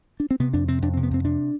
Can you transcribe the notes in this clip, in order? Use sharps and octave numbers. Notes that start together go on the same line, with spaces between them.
D4
C4
C3 B3
F2 D4
C3 C4
F2 D4
C4
C3
B3
F2 C4
C3 D4